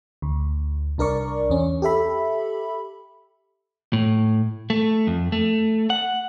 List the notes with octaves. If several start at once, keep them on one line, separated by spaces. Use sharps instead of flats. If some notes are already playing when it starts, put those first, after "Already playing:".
D2
C2 D4 A#4 D5 C#6
E2 C#4
G4 A4 E5 B5
A2
A3
F2
A3
F#5